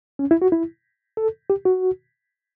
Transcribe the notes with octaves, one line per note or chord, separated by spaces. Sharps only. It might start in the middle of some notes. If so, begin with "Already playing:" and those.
C#4
E4
F#4
E4
A4
G4
F#4